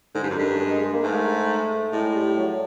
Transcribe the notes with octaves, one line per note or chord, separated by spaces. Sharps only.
G#2 D3
G2
F#2
G2 D#3
G#3
G#3
G#3
A#3
G#2 A3
A2 G#3
G3
F#3